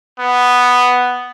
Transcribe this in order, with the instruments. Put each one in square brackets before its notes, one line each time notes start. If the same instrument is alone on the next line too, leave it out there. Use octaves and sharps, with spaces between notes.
[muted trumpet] B3